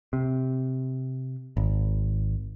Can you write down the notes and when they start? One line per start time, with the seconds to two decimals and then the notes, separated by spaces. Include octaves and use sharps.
0.13 C3
1.57 G#1